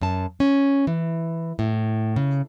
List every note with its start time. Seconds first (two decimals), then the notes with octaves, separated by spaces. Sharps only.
0.02 F#2 A5
0.40 C#4
0.87 E3
1.59 A2
2.16 C#3